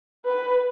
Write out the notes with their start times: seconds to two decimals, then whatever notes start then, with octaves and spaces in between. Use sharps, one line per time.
0.25 B4